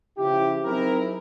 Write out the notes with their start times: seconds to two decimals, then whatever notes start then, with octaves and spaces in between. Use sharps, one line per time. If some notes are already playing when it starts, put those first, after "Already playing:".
0.17 C#3 F3 E4 G4
0.65 F#3 C4 D#4 E4 G#4 A#4